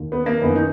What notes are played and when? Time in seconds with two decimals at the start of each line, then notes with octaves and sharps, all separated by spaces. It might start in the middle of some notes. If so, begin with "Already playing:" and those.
Already playing: D#2 D#3
0.12 B3
0.26 A#3
0.42 F#2 D#3 B3
0.56 D#4